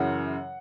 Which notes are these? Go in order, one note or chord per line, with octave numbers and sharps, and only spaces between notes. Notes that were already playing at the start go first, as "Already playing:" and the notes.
Already playing: F#2 C#3 E3 F#5